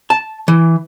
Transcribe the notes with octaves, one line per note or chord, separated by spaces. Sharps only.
A5
E3